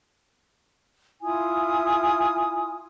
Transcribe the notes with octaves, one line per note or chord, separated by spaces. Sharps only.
E4 F4 G#5 D#6